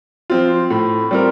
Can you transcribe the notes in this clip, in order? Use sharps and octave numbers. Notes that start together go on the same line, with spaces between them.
F3 C4 F4
A2
G3 C4 F4 A#4